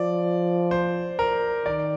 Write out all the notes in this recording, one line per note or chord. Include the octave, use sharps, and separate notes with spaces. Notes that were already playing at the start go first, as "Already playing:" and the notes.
Already playing: F3 D5
C5
A#4
D#3 D5